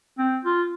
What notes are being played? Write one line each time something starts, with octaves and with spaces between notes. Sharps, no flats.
C4
F4